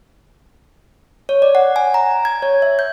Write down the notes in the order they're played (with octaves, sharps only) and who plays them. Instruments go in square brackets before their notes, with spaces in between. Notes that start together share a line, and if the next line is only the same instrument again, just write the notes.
[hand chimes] C#5
D5
F#5
G#5
A#5
G#6
C#5
E5
G6